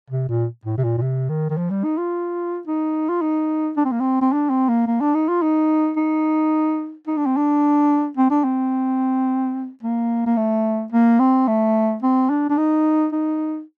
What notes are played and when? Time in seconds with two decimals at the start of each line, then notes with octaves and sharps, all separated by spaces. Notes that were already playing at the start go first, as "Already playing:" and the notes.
0.10 C3
0.29 A#2
0.65 A2
0.77 C3
0.84 A#2
0.98 A#2
1.02 C3
1.29 D#3
1.50 D#3
1.57 F3
1.70 G3
1.84 D#4
1.98 F4
2.67 D#4
3.09 F4
3.22 D#4
3.77 D4
3.85 C4
3.92 A#3
4.00 C4
4.22 C4
4.32 D4
4.50 C4
4.69 A#3
4.87 A#3
5.01 D4
5.15 D#4
5.28 F4
5.42 D#4
5.97 D#4
7.07 D#4
7.17 D4
7.26 C4
7.37 D4
8.17 C4
8.30 D4
8.44 C4
9.83 A#3
10.26 A#3
10.37 A3
10.92 A#3
11.20 C4
11.47 A3
12.03 C4
12.30 D4
12.50 D4
12.57 D#4
13.12 D#4